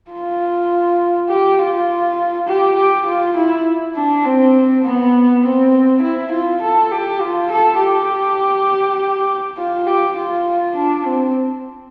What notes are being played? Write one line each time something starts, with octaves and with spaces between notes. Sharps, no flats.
F4
G4
F4
G4
G4
F4
E4
D4
C4
B3
C4
E4
F4
A4
G4
F4
A4
G4
F4
G4
F4
D4
C4